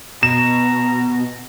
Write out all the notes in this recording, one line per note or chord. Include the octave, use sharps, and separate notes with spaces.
B2 A#5 E7